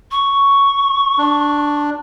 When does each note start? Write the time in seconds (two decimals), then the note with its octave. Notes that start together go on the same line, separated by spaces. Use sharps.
0.12 C#6
1.18 D4